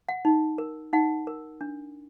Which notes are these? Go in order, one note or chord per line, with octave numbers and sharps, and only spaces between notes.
F#5
D#4
A#4
D#4 F#5
A#4
D4